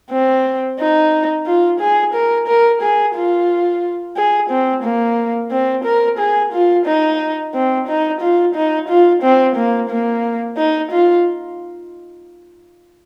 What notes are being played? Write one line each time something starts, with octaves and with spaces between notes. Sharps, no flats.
C4
D#4
F4
G#4
A#4
A#4
G#4
F4
G#4
C4
A#3
C4
A#4
G#4
F4
D#4
C4
D#4
F4
D#4
F4
C4
A#3
A#3
D#4
F4